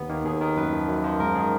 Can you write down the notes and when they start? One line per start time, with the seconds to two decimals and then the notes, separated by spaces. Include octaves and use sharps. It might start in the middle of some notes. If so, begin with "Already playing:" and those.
Already playing: D#2 B3
0.09 D#3 A#3
0.25 D#2 G#4
0.41 D#3
0.57 F#2 B4
0.73 F3
0.89 F#2
1.04 F3
1.20 G#2 A#4
1.35 D#3 G#4